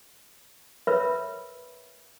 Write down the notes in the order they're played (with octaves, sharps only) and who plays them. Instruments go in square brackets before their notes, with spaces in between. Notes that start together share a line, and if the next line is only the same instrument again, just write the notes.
[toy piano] A#4 B4 C#5 E5 B5